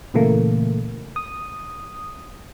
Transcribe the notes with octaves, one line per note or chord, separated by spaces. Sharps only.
A#2 C#3 E3 A3 A#3
D#6